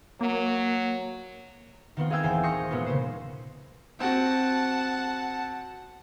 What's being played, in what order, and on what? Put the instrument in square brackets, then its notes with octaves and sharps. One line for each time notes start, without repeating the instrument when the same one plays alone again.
[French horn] F#3 [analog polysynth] A#3
[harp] D#3 B3 C4 F4
G#4 D#5 F5 G5 E6 G#6
D#1 E3 C5 G#5
D#5 C6 C#6 D#6 G6 A#6
A#2 G#3 B3 C#4 F4
C#3 C5
[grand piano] C4 F#4 [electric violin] F#5 A5